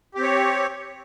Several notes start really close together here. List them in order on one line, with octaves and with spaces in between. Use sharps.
G4 C4 C#5